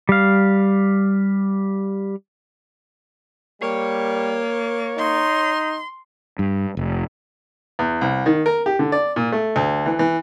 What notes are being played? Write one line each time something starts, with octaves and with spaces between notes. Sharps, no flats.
G3 F5
G3 A#3 C#5
D#4 C6
G2
F1
E2
C2
D#3
A#4
G4
D3
D5
A#2
A3
D2
E3
E3